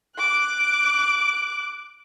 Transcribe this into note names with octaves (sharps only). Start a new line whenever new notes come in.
D6 F#6